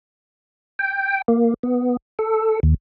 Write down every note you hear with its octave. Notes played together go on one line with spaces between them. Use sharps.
G5
A#3
B3
A4
D#2